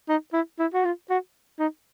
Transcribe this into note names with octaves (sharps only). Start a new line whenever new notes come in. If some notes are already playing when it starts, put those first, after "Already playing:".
D#4
E4
E4
F#4
F4
F#4
D#4